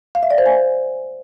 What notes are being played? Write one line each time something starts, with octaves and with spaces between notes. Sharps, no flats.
F5
E5
D5
C5
G#5